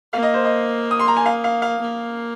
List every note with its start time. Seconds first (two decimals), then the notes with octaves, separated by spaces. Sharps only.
0.13 A#3 F5
0.23 D#5
0.34 C5
0.44 D#5
0.91 D#6
0.99 C6
1.08 A#5
1.17 G#5
1.26 F5
1.44 F5
1.62 F5
1.81 A#3